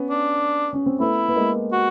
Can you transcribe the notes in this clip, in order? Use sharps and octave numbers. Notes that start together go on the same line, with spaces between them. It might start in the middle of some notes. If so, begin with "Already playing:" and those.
Already playing: B3 C#4
D4
C#4
C4
A3 B3 E4
B3
G#3 A#3
F#4